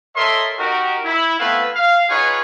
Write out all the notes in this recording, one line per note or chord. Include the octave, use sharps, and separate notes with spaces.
A4 A#4 C#5 D#5 E5 C6
D#4 F#4 G4 A#4
E4
A3 B3 C4 E4 B4 F5
F5
D#4 F4 F#4 G#4 B4 C#5